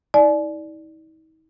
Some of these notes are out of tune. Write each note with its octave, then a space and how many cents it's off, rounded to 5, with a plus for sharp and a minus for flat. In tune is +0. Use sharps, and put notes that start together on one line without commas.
D#4 +45 D5 +5 G#5 +45